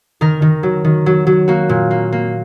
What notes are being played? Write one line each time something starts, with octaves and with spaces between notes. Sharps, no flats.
D#3 A#4
D#3
F#3
D#3
F#3
F#3
A#3 F#4
A#2
A#3
A#3